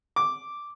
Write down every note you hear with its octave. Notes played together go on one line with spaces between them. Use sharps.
D6